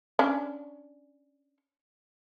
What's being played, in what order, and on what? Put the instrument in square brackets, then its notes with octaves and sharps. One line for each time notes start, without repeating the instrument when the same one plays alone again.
[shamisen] C#4 D4